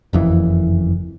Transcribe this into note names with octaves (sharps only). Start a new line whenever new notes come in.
F#1 F2 E3